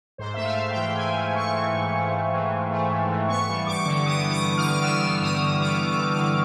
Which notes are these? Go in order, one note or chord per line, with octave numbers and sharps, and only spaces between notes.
G#2 C5
A3 E5
F5
G#2
G5
E3
G#2 G#5
A3
G#2 C#6
E3
G#2
A3
G#2
E3
G#2
A3
G#2
E3
B3 C#6
G3
G2 D6
D3
B3 D#6
G3
D6
G2
F6
D3
B3 E6
G3
G2 D#6
D3
B3 D6
G3
D6
G2
D6
D3